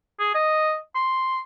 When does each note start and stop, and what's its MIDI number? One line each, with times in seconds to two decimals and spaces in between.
0.20 0.33 68
0.35 0.77 75
0.95 1.40 84